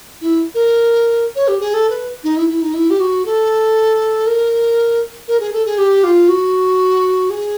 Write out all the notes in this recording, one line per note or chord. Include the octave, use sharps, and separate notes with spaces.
E4
A#4
C#5
G4
G#4
A4
B4
D#4
E4
E4
D#4
E4
G4
F#4
A4
A#4
A#4
G#4
A4
G#4
G4
F4
F#4
G#4